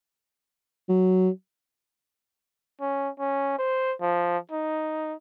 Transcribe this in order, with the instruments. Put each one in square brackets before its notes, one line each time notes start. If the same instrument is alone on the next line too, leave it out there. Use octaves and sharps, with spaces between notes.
[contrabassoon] F#3
[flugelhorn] C#4
C#4
C5
F3
D#4